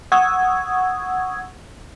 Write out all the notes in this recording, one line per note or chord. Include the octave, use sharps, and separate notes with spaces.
F#5 C#6 D#6 E6 G#6